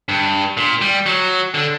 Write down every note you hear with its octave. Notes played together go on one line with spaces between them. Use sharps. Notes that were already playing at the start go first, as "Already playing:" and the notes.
G2
A#2
G3
F#3
D3